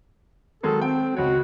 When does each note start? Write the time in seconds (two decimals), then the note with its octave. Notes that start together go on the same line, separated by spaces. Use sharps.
0.63 D#3 F#3 G#3 A4
0.81 C4 G5
1.17 C#2 F#4 C#5